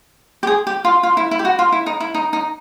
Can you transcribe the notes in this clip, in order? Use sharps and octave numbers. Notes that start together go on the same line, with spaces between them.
G4
G#4
G4
F4
F4
E4
E4
G4
F#4
F4
E4
D#4
E4
D#4
D#4